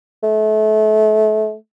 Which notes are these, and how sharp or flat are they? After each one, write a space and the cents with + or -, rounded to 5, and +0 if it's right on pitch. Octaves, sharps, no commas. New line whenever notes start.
A3 -30